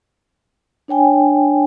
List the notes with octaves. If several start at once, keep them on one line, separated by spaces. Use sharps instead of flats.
D4 C#5 G5 G#5